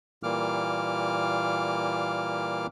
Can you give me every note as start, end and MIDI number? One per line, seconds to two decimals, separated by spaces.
0.23 2.67 46
0.23 2.67 52
0.23 2.67 55
0.23 2.67 58
0.23 2.67 86
0.23 2.67 89